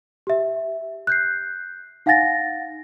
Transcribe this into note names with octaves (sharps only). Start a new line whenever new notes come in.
G4 E5
F#6 G6 C7
D#4 F5 F#5 G#5 A6 A#6